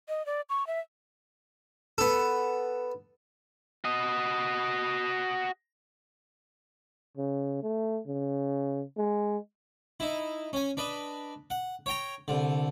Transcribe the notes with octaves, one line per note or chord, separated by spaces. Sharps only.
D#5
D5
C#6
E5
B3 A4
F#4 D#5
C#3
A3
C#3
G#3
D#4 E4
C#4 G#5
D4 B4 D#5
F#5
C#5 G5 A#5
C2 D3